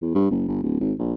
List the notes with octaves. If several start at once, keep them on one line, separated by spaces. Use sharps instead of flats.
E2
G2
F#1
G1
D1
G#1
A#1